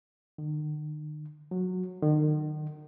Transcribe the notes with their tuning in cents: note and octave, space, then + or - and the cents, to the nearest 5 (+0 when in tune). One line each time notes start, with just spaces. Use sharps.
D#3 -45
F#3 -15
D#3 -40